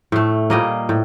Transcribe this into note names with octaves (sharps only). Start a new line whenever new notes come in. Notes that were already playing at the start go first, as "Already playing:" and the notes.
A2 A3
A#2 G3 A#3 D#5
A2